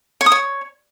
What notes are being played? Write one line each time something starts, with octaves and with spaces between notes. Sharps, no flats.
C#5
D#6
C#5